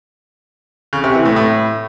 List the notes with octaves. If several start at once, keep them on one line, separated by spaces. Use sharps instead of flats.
C#3
C3
E3
A2
A2